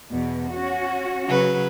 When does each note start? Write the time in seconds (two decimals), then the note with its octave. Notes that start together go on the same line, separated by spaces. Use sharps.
0.11 E2 B2
0.51 C#4 F#4
1.28 C#3 F#3 B4